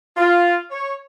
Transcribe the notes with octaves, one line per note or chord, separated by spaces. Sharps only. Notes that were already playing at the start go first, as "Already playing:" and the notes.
F4
C#5